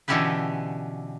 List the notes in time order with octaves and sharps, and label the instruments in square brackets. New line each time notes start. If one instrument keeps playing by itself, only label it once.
[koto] B2 D3 E3 C#4 G4 B4